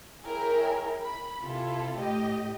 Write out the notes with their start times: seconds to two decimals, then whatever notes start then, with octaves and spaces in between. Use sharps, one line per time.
0.24 E4 G#4 A#4 C#5 G5
1.02 B5
1.43 C3 E4 F4 A4
1.98 A2 G4 D#5